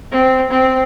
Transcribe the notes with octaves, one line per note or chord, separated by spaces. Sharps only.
C4
C4